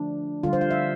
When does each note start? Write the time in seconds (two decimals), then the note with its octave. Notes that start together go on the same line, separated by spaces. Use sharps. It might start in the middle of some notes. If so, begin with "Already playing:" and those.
Already playing: D3 F3 A3 D4
0.43 D3 G3 F4
0.53 C5
0.61 F5
0.71 E5